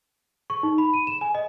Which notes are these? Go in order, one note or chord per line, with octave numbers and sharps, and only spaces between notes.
C#6
D#4
B5
D#7
E7
G#5
D#5